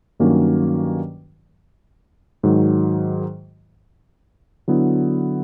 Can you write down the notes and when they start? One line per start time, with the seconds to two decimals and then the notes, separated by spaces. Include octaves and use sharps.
0.20 G2 D#3 F#3 A#3 C#4
2.43 G#2 D#3 F#3
4.68 D3 F#3 B3 E4